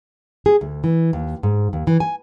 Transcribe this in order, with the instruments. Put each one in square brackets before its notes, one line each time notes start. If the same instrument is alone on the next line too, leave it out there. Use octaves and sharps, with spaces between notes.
[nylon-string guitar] G#4
D2
E3
D#2
G#2
D#2
E3
G#5